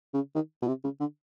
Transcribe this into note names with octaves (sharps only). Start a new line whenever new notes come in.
C#3
D#3
B2
C3
C#3
D3